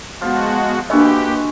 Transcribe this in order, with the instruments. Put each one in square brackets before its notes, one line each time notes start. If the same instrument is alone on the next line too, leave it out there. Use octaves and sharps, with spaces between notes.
[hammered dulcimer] F3 F4 [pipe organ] G#3 F#4 [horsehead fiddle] B3
[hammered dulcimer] G#3 E4 F#4 [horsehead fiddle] A#3 B4 [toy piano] D4 D#5 [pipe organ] G4